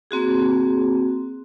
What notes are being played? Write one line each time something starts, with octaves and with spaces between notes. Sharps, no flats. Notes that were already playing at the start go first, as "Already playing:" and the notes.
A#3 C4 F#4 G#4